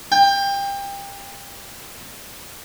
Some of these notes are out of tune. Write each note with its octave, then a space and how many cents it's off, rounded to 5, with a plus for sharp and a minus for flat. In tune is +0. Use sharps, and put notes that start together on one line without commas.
G5 +25